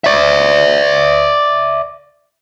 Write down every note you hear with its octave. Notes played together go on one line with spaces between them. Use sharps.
D5 E5